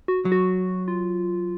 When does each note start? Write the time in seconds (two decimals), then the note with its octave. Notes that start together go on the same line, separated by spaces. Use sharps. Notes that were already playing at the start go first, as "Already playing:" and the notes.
0.08 F#4
0.25 F#3
0.32 F#4
0.88 F4